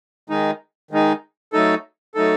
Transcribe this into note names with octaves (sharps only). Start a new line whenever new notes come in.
D#3 G#3 D#4
D#3 G#3 D#4
F#3 A3 D#4 A4
F#3 A3 D#4 A4